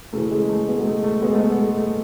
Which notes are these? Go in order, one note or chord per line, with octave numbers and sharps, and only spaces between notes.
C#3 E3 A3
G#3
A3
G#3 B3
G#3
A3
A3
G#3 B3
A3
G#3 B3
G#3
A3